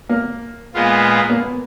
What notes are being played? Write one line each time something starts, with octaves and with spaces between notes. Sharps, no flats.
A#3
A#2 G#3 B3 F4
A#3
B3